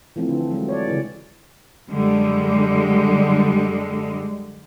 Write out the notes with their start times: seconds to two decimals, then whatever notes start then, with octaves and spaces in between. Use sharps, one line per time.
0.16 E3 F3 A3 C4
0.29 D3
0.51 F#3 G#3
0.68 C#5 D5
0.87 C#3 E3
1.91 F#2 D3 G3 G#3